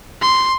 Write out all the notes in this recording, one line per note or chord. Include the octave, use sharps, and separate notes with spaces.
C6